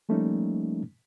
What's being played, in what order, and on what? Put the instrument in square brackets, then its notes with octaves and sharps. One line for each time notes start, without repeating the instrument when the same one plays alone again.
[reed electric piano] F3 G3 A3 A#3 C#4 D#4